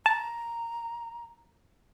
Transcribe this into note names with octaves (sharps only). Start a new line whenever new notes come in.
A5 A#5